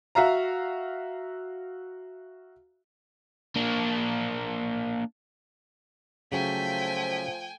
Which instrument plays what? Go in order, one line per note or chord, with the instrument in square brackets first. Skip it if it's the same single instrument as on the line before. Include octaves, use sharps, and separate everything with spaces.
[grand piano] F#4 E5 F5 A#5
[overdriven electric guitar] A#3 D4
[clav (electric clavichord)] C#3 F#3 C#4 [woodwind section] F3 [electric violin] A3 B6 [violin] G5 G#5